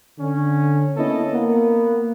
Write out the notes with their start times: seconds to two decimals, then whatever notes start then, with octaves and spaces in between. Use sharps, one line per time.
0.19 D3 C#4
0.97 A#3 B3 C#4 E4 A4 D#5
1.33 A#3 B3